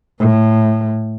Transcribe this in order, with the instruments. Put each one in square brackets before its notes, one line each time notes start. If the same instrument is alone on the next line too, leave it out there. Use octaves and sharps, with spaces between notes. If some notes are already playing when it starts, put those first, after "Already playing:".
[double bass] A2